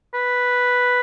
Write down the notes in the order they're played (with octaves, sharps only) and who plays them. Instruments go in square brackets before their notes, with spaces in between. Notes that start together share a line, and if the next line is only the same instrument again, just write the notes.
[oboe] B4